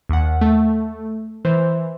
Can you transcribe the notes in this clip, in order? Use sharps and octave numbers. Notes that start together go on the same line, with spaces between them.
D#2 F#5
A3
E3 C5